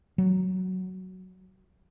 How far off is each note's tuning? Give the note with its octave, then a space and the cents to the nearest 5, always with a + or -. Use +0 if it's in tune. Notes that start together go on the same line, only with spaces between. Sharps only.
F#3 +5